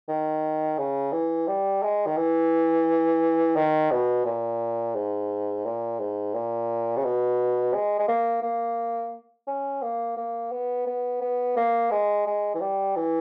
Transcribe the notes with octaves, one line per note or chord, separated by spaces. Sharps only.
D#3
C#3
E3
G3
G#3
D#3
E3
D#3
B2
A#2
G#2
A#2
G#2
A#2
C#3
B2
G#3
G#3
A#3
A#3
C#4
A#3
A#3
B3
B3
B3
A#3
G#3
G#3
E3
G3
E3